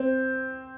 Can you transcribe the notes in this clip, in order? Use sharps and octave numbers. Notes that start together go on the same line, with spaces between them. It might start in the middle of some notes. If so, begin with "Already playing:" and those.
Already playing: C4